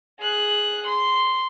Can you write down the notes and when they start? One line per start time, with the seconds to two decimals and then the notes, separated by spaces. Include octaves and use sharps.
0.21 G#4 F#6
0.87 C6